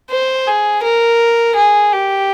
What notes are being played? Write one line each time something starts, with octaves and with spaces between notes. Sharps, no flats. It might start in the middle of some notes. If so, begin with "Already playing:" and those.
C5
G#4
A#4
G#4
G4